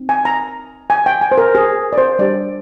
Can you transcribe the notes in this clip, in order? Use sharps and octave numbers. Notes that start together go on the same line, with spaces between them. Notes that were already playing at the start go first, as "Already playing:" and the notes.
Already playing: C4 D#4
G#5
A#5
G#5
G5
G#5
C5
A#4
G#4
D5
C5
G3 D4 G4 D5